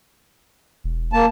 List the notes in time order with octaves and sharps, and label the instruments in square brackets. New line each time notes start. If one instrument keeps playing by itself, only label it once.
[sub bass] E1
[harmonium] A#3 A5